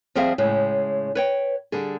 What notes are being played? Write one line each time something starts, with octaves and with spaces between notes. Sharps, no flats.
F3 G3 C4 G#4 E5 F5
A2 C#3 G#3
B4 C#5 G5
D3 G3 G#4